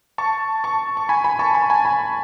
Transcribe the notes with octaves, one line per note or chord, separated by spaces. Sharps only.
A5 C#6
A5 C#6
C#6
G#5 B5
G#5 B5
A5 C#6
G#5 B5
G#5 B5
G#5 B5